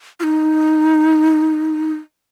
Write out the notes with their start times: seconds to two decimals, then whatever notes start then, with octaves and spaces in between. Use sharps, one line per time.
0.20 F4
0.23 D#4